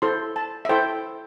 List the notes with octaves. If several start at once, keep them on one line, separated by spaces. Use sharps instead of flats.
E4 A4 C5 C6
A5
E5
E4 A4 C5 G5